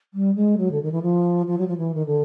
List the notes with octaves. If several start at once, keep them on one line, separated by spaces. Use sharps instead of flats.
G3
G#3
F#3
D3
D#3
E3
F3
F3
F#3
F3
E3
D#3
D3